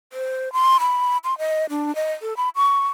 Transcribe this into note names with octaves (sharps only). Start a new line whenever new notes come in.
C5
C6
B5
C6
D#5
D4
D#5
A4
B5
C#6